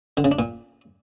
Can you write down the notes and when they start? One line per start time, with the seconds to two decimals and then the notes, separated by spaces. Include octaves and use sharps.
0.17 D3
0.24 C#3
0.32 D4
0.39 A#2